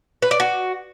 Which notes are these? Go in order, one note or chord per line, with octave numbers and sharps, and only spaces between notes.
B4
D5
F#4